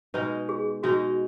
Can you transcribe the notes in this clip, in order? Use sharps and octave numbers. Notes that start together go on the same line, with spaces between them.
B2 G#3 D#4 B4
G#4
B2 G#3 D#4 F#4